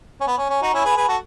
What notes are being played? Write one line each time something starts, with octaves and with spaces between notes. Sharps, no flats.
C#4
B3
C#4
C#4
D#4 F#4
C#4 E4
G#4 B4
G#4 B4
F#4 A4